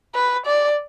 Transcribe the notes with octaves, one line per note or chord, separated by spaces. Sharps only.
B4
D5